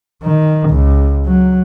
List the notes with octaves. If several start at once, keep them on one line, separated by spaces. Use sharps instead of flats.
D#3
C#2
F#3